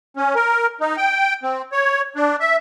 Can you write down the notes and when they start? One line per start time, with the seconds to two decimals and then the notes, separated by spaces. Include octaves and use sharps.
0.17 C#4
0.35 A#4
0.81 D#4
0.97 G5
1.43 C4
1.72 C#5
2.16 D4
2.40 E5